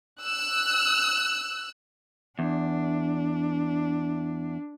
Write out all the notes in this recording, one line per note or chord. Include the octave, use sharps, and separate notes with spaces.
E6 F#6
E2 D4